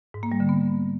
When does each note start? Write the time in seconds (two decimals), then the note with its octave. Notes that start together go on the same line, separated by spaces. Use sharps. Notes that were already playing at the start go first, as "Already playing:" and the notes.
0.14 G#2
0.23 A#3
0.32 G3
0.40 D3
0.49 B3